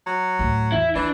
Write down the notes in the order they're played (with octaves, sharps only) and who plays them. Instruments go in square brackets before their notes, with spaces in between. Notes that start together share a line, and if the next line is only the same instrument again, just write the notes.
[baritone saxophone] F#3
[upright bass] D2 A2
[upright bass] E2 [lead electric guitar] E4
[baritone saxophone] E3 [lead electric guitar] D4 [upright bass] F4